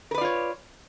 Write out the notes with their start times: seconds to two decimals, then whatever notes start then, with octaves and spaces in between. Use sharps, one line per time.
0.11 A#4
0.14 B4
0.18 D5
0.21 F4
0.25 C#5